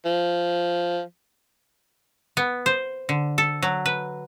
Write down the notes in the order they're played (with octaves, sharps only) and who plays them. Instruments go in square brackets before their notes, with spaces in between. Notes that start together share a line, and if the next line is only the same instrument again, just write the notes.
[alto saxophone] F3
[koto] B3
C5
D3
A4
F#3
B4